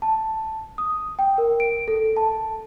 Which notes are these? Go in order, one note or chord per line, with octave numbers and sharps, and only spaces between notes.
A5
D#6
G5
A#4
D7
A4
A5